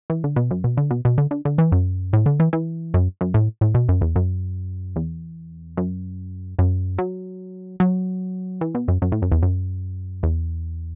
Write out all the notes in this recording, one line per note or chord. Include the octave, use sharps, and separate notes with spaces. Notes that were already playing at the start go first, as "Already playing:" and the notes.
E3
D3
B2
F#2
B2
D3
B2
B2
D3
D3
D3
E3
F#2
A2
D3
E3
E3
F#2
F#2
A2
A2
B2
F#2
E2
F#2
E2
F#2
F#2
F#3
F#3
E3
B2
F#2
F#2
A2
F#2
E2
F#2
E2